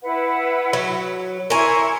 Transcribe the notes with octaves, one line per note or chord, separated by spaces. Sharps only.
E4 B4 F#5
F#3
E4 A#4 G#5 C6 C#6